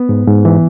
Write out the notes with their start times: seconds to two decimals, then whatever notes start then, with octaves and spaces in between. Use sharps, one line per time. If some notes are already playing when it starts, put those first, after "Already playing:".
Already playing: B3
0.09 G#2
0.27 G#2
0.45 E3